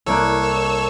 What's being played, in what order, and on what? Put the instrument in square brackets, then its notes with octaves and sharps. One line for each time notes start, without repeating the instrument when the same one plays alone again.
[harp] C2 A#3 F#6 [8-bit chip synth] A4 C#5 E6